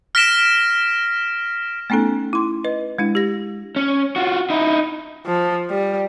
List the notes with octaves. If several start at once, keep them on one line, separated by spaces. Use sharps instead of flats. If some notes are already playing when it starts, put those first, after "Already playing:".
F6 A#6 B6 D7 E7
A3 B3 C#4 D#4 A4
E4 C6
B4 D#5
G#3 D4 E4
G4 A#6
C#4
F4 F#4
D#4 E4
F3
G3